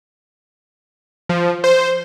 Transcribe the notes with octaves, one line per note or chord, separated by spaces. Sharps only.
F3
C5